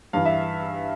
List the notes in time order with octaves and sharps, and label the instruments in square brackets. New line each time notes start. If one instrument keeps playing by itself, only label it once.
[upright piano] G2 E3 F5
E5